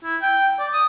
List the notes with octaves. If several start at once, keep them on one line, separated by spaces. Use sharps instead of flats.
E4
G5
D5
D#6